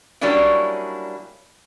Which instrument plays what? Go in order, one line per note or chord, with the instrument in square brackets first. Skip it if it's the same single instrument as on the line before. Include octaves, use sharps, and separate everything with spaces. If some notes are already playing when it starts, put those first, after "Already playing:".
[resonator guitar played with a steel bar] F#3 G3 A#3 C#4 D4 E4